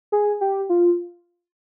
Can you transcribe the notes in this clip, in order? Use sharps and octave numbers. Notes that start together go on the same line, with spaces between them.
G#4
G4
F4